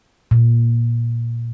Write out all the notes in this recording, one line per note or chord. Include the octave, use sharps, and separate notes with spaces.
A#2